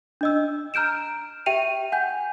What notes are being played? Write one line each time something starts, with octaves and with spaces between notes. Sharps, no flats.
D4 D#5 E6
A#5 F6 G6 D7 E7
G4 E5 G5 D#7 F7
F#5 G#5 G6